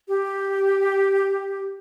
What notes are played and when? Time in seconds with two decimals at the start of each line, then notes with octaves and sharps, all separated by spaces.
0.08 G4